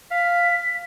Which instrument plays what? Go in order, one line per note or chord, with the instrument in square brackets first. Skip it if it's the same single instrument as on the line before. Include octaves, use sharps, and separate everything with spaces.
[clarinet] F5 [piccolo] B6